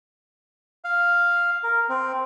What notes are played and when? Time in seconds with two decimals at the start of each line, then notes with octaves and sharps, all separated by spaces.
0.85 F5
1.63 A#4
1.89 C4